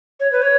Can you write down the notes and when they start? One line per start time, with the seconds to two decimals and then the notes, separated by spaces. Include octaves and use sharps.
0.20 C#5
0.32 B4
0.42 C#5